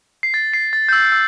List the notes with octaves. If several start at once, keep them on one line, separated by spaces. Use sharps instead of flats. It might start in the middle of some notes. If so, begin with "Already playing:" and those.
C7
A6
C7
A6
G6
E6
E6